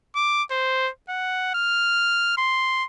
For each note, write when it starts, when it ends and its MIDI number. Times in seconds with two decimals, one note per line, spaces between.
0.15 0.43 86
0.51 0.89 72
1.09 1.51 78
1.54 2.36 89
2.37 2.85 84